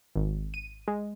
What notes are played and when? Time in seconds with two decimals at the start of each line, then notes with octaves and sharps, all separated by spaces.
0.16 G#1
0.54 D#7
0.88 G#3